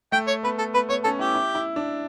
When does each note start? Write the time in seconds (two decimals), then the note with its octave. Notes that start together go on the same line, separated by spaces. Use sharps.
0.12 A3 G5
0.28 C#5
0.43 B3 B4
0.58 A4
0.74 B3 B4
0.89 B3 C#5
1.04 C#4 A4
1.19 E4 G4
1.35 E4
1.55 E4
1.76 D4